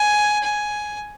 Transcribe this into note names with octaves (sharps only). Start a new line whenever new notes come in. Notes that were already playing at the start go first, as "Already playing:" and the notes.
Already playing: G#5
G#5